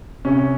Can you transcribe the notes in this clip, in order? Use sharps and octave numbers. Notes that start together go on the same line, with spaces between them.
C3 C#4